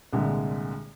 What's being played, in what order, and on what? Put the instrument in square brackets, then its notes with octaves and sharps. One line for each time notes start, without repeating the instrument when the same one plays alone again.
[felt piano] C2 A#2 D3 G3 G#3